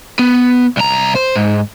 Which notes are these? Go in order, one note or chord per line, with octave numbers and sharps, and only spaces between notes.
B3
C2 A#5
C5
G#2